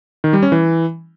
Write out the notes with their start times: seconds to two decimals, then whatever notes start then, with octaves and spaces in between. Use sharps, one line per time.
0.24 D#3
0.33 G3
0.43 C#4
0.52 E3